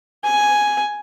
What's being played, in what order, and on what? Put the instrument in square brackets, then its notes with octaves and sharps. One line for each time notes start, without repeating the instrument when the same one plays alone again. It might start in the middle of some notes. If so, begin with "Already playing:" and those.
[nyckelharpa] G#5